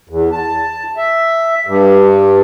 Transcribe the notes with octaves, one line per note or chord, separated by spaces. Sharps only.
E2
A5
E5
G2